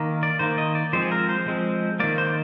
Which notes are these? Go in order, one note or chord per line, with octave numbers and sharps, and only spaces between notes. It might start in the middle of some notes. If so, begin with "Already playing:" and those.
Already playing: D#3 A#3
D5
D#3 A#3 C5
D#5
D5
F3 G#3 C4 C5
G#4
A#4
C5
F3 G#3 C4
D#3 A#3 D5
C5